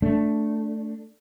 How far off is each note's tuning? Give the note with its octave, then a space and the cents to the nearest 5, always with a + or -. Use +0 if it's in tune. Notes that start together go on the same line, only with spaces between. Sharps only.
A3 +0 D4 -10